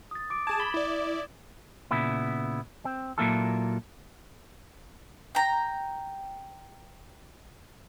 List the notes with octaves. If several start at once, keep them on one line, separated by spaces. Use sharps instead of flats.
D#6 A6
D6 D7
G#4 A5 G#6 A6 E7
B5 G7
E4 D5
A#2 C#3 B3 E4
C4
A#2 F#3 A#3 E4 F4 A4
G5 A#5